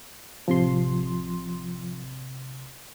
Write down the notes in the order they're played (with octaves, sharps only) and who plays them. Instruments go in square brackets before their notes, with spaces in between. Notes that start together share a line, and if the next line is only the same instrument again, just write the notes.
[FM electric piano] A1 C3 C6 [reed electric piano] F3